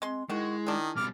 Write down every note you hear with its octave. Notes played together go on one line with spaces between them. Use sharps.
G#3 C4 C6
D#3 G#3 E4 F#4
D#3 D4 G#4
B2 G3 D6 F6